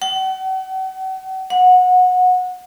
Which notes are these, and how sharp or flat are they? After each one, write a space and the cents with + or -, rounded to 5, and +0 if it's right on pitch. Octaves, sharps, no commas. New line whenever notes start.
F#5 +40
F#5 -20